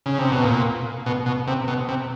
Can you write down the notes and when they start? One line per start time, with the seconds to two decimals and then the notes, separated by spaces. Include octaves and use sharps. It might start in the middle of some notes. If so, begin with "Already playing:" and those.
0.06 C#3
0.18 C3
0.31 B2
0.44 A#2
1.06 B2
1.26 B2
1.47 C3
1.68 B2
1.89 C3